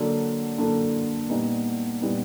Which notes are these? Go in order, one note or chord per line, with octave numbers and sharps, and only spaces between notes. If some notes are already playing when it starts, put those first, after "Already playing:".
Already playing: D3 F#3 A#3 D4
D3 F#3 A#3 D4
A#2 G3 B3 D#4
A#2 G3 B3 D#4